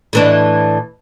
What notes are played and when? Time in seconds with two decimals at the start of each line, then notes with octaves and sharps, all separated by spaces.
0.13 A2 E3 D4